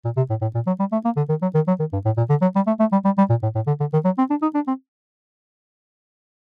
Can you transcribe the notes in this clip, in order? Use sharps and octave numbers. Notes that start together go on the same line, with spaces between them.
A#2
C3
A2
A2
A#2
F#3
G3
A3
A#3
D3
D#3
F#3
D#3
F#3
D#3
G2
A2
A#2
D3
F#3
G3
A3
A3
G3
G3
G3
A#2
A2
A2
D3
D3
D#3
F#3
C4
D4
D#4
D4
C4